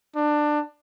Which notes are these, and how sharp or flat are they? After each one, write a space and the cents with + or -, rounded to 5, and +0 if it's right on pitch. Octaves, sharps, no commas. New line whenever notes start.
D4 +20